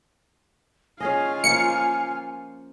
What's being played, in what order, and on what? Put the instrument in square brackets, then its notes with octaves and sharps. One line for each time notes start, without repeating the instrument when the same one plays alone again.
[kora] C#4 G#4 D#5 [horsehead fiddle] F4 F5 [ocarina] G#5
[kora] F3 A#3 [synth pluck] C#7